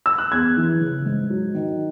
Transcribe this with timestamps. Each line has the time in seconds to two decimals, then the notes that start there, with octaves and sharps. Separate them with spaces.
0.06 E6
0.18 F#6
0.32 E2 G#6
0.57 E3
0.81 C#3
1.06 G#2
1.30 F#3
1.54 D#3